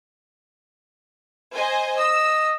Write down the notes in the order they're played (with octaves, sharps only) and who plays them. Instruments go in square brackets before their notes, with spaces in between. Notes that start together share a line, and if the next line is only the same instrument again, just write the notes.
[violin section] C5 D#5 G#5
[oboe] D#5 [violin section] E6